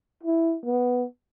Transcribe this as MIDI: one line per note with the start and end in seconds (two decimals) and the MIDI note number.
0.23 0.55 64
0.65 1.04 59